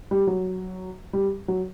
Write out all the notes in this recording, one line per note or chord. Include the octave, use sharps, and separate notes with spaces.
G3
F#3
G3
F#3